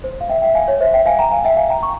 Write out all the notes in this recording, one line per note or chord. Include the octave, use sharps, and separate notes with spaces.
C5
F5
E5 G5
E5 G5
F5 G#5
C#5
C5 E5
E5 G5
F5 G#5
G5 A#5
F5 G#5
E5 G5
F5 G#5
G5 A#5
A#5 C#6